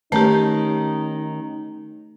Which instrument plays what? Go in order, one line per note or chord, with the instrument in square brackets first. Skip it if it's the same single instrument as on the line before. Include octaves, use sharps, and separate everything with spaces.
[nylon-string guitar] D#3 C#4 [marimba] A3 G4 [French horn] D#4